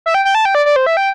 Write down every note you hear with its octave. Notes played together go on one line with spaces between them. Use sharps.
E5
G5
G5
A5
G5
D5
D5
C5
E5
G5